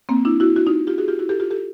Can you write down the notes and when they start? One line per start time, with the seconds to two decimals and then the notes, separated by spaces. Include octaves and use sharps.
0.09 A#3 C4
0.25 D4 E4
0.40 E4 F#4
0.56 E4 F#4
0.66 D#4 F4
0.87 F4 G4
0.98 F#4 G#4
1.08 F4 G4
1.19 E4 F#4
1.29 G4 A4
1.40 F4 G4
1.51 G4 A4